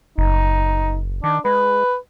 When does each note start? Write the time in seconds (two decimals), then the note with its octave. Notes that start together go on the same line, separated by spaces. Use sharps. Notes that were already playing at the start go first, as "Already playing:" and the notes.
0.18 F#1 D#4
1.24 D#3 D4
1.45 G#3 B4